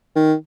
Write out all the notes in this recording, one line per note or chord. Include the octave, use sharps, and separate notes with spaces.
D#3